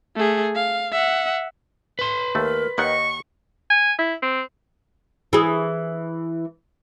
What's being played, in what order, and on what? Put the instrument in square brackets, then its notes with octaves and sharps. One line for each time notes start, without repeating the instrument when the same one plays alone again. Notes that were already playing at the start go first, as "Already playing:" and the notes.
[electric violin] A3 G#4
F5
E5 F#5
[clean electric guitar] B4 C6
[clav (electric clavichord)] D#2 A3 [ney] A#4
[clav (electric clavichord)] D#2 D#3 F#5 [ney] D#5 [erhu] C#6
[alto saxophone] G#5
E4
C4
[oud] E3 G#4